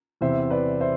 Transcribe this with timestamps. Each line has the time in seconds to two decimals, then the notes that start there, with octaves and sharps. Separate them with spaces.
0.21 E2 C3 E3 C5 E5
0.50 B4 D5
0.80 C5 E5